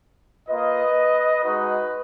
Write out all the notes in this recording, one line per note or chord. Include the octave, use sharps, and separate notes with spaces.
A#3 F4 B4 D#5
G#3 D#4 F#4 B4 D#5